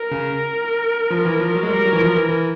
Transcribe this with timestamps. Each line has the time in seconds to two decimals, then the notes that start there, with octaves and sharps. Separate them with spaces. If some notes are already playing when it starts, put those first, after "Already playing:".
Already playing: A#4
0.12 C#3
1.11 F3
1.25 E3
1.40 F3
1.55 F#3
1.63 G#3
1.70 G3 A#4
1.85 F#3
1.93 E3
2.00 F3
2.14 E3
2.29 E3